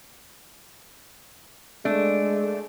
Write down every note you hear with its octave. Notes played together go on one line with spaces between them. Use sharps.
G#3 A3 D4